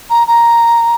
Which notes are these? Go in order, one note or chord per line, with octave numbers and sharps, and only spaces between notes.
A#5
A#5